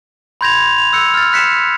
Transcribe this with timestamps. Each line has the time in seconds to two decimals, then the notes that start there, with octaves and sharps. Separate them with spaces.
0.41 B5 C6 G6 G#6 A#6 F7
0.78 F7
0.93 E6 F#6 G6 C#7
1.14 F6 A6
1.33 F#6 B6 C#7 E7